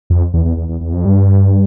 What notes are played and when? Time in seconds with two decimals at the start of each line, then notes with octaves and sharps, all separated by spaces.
0.10 F2
0.34 E2
0.45 E2
0.57 E2
0.69 E2
0.81 E2
0.92 F2
1.05 G2